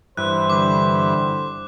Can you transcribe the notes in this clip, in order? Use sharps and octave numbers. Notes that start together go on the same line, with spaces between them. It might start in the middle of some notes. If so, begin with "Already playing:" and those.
G2 E3 C5 F#6
D3 G3 D6 F#6